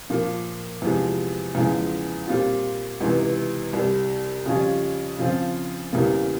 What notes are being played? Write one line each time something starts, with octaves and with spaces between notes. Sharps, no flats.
A#2 F3 A#3
E2 C3 F3 G#3
E2 C#3 F3 G#3
A#2 G3 C4 F4
C#2 C3 E3
C2 C3 G3
F2 C#3 G3 C#4 F4
C#3 F3 C4 F4
E2 C#3 G3 A#3